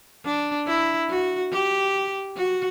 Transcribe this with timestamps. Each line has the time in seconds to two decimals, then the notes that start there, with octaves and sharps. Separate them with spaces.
0.25 D4
0.67 E4
1.09 F#4
1.52 G4
2.37 F#4